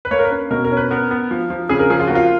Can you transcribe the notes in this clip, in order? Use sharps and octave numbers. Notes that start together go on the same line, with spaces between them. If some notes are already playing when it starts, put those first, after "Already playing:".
B4
A#3 C#5
A#4
B4
C#4
B2 A#4
A#4
C#4
B4
B3 A#4
B3
F3
F3
C#3 G#4
A#4
F3 G#4
F4
A#3 F#4
F4